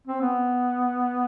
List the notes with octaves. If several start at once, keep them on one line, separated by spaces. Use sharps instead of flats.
C4
B3